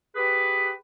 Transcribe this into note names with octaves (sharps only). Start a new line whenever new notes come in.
G4 G#4 B4